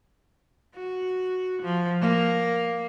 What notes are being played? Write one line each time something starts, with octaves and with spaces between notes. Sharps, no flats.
F#4
F3
A#3